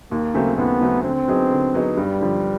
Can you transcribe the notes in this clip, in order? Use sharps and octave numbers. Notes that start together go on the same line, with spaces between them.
D#2 A#3
C#3 F#3 A3 C4
D#2 B3
C#3 F#3 A3 C4
D3 C4
F#3 B3 D#4 G#4
D3
F#3 B3 D#4 G#4
G2 G3
D3 F3